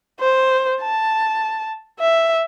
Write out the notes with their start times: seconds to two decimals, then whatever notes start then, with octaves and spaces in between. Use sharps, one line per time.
0.20 C5
0.81 A5
2.00 E5